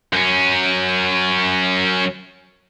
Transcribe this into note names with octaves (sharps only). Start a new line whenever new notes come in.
F#2 C#4